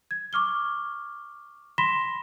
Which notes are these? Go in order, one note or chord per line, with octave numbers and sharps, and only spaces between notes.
G#6
C#6 D6 F6 G7
B5 C6 A#6 B6 E7 G7